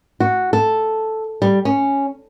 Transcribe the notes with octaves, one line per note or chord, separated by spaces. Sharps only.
F#4
A4
G3
C#4